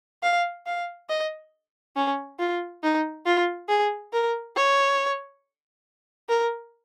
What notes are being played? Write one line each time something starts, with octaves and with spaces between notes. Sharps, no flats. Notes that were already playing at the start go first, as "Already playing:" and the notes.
F5
F5
D#5
C#4
F4
D#4
F4
G#4
A#4
C#5
A#4